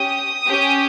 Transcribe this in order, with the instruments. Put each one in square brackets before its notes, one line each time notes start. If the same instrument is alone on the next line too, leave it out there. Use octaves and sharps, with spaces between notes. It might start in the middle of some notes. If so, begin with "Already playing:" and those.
Already playing: [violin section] C#4 G4 D#6
C#4 G4